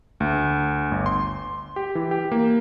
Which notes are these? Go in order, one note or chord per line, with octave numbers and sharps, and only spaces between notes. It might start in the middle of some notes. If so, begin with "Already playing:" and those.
D2
G1
C6
G4
E3
G4
A#3